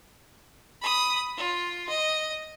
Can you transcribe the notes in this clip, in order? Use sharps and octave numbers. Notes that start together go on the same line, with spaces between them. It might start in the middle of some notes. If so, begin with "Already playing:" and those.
B5 D#6
F4
D#5